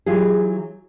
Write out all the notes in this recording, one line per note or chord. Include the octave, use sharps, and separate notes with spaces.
E3 F#3 F4 G4 G#4